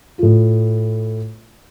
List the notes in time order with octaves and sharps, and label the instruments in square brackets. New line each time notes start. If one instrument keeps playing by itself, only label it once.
[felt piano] A2 F4